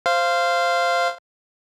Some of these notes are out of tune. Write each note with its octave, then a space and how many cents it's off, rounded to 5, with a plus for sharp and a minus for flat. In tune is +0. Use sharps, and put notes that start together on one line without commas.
C5 +0 F5 -15